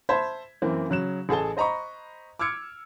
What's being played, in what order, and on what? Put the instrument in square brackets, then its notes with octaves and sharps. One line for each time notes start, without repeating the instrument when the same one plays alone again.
[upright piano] C5 E5 A5 B5 G#6 B6
F#2 E3 A#3 C4
C#3 F#3 F#6 E7
A1 G#4 A4 A5 G7
C5 D#5 A#5 B5 C#6
D6 E6 F6 G#6 C#7 D7